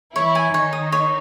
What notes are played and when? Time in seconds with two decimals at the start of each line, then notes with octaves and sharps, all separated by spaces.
0.16 E3 E4 C#5
0.35 G#5
0.54 D#3 D#4 C#5
0.73 D#6
0.92 C#5